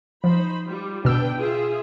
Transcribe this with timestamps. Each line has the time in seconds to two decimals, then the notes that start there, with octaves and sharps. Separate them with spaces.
0.24 F3 D#4 C5 B5
0.66 G3 F4
1.05 B2 D4 B4 G5 E6
1.38 F4 G#4 E5